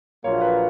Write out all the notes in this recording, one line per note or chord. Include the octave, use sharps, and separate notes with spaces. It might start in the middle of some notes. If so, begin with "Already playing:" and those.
A#1 A#2 F#3 A#3 F4 C#5
B4